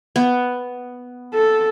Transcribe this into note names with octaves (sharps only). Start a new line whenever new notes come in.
B3
A4